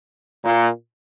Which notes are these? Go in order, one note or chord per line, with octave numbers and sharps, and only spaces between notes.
A#2